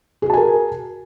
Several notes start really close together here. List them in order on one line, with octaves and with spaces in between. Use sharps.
G#4 F#4 A5 G#5 A#4